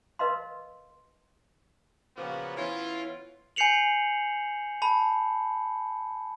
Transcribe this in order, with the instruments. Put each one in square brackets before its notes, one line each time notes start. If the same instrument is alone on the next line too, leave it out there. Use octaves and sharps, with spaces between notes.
[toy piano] A#4 B4 D#5 F5 C6
[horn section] A#2 C#3 F3 A#3 B3 F#4
E3 B3 C#4 E4 F4
[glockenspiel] G#5 G6 C7 C#7 F7 F#7
A5 B5